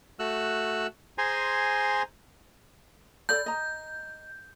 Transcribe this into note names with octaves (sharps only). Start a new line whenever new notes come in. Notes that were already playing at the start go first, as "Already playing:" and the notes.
A3 F#4 E6 F#6
G#4 C5 G#5 A#5 C6
A4 D5 B5 G6
D#5 A#5